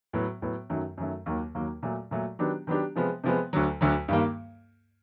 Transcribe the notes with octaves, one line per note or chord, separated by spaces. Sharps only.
A2 F#3 B3
A2 F#3 B3
F#2 D#3 F#3 A3
F#2 D#3 F#3 A3
D#2 D#3 F#3 A#3
D#2 D#3 F#3 A#3
A#2 F#3 A3
A#2 F#3 A3
D#3 F#3 B3 D4 G4
D#3 F#3 B3 D4 G4
C3 F3 G#3 B3
C3 F3 G#3 B3
D2 D3 F#3
D2 D3 F#3
G2 D#3 G3 A#3